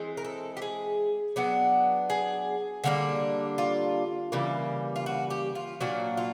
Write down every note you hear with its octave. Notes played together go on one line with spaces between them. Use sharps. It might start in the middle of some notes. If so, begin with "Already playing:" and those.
Already playing: E3 G#3 C4
A#4
A4
G4
G#4
F#3 B3 D4
G#4
D3 G3 A#3 D4
F4
C#3 E3 G3 A#3
F4
F#4
G4
F4
A#2 F#3 A#3 D4 F#4
F4